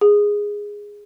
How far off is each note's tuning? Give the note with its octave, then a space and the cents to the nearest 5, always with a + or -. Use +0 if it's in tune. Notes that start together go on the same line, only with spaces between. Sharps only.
G#4 -10